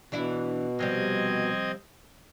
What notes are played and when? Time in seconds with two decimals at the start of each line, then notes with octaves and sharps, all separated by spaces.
0.12 B2 E3 D4 E4
0.79 C3 F3 G3 C4 D#5 G#6